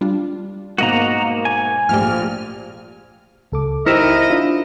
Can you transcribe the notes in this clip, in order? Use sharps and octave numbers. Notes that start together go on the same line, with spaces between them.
G3 D4 F4
G#2 B2 A#3 F#4 D#5 A#5
G#5
A#1 G#2 F3 A3 G4 F6
C#2 A4 D6
D#4 E4 G4 A#4 C5 D#5 E5 C#7
D4 F4